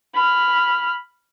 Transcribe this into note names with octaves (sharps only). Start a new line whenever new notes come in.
B5 F6